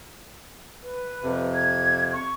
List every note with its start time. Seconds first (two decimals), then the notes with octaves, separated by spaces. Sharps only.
0.83 B4
1.23 F2 C3
1.55 G#6
2.12 C#6